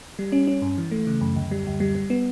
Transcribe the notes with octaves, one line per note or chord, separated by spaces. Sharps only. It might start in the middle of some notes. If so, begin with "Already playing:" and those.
G3
C#4
C#4
G2
E3
A3
C#3
F#2
D2
G3
D2
G3
G3
B3